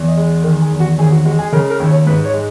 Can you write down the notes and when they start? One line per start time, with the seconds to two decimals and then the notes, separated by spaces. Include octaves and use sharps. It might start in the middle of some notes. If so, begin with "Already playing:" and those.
Already playing: E2
0.08 D#5
0.17 G#3
0.43 D#3 A#4
0.62 G#4
0.71 E2
0.80 F#4
0.98 D#2 G#4
1.12 F#4
1.25 G#3 F#4
1.39 G#4
1.52 C#3 A#4
1.70 A#4
1.80 D#2
1.88 C#5
2.07 G#2 B4
2.25 C#5
2.34 G#3